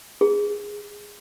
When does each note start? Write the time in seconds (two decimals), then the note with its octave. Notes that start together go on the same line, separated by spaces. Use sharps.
0.21 G#4